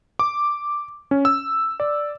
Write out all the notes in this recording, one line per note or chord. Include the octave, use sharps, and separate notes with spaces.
D6
C#4
E6
D5